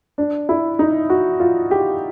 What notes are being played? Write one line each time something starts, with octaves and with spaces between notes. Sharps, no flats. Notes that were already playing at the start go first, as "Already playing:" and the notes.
D4
E4
D#4
F#4
F4
G4